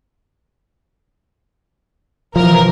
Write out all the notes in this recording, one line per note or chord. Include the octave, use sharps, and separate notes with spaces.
C3 E3 F3 A#4 A#5